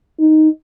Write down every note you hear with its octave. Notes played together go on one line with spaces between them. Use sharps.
D#4